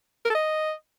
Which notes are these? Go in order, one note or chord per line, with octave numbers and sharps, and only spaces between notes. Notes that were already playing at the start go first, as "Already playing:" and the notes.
A#4
A4
D#5